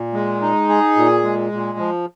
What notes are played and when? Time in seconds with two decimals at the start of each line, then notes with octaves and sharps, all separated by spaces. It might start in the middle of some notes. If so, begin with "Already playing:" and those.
Already playing: A#2
0.13 G#3
0.41 D#4
0.69 G#4
0.96 A#2
1.24 G#3
1.52 A#2
1.79 F3